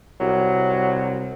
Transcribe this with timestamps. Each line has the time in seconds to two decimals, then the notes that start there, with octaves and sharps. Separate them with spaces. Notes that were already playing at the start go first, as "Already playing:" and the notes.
0.20 C2 F#3